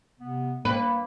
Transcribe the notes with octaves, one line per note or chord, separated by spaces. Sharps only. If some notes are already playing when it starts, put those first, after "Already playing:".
C3 B3
A#3 B4